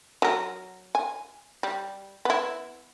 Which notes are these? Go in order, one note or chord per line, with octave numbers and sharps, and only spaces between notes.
F#3 A#4
G#5
G3
B3 E4